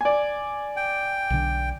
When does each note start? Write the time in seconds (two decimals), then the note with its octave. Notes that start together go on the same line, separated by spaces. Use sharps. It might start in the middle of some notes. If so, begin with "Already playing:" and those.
0.01 D5 G#5
0.76 G5
1.30 B1 D3